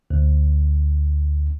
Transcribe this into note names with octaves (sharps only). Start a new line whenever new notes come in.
D2